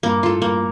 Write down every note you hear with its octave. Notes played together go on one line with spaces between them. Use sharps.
G2 A#2 A#3
A2 F4 A4
G2 A#2 A#3